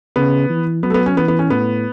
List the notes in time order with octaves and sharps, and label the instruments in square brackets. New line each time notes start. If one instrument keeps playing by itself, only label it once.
[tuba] C#3 [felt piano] B3
[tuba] E3
[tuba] F#3 [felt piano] B3
[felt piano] A3
B3
C#4
[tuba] E3 [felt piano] B3
[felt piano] B3
C#4
[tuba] A2 [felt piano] B3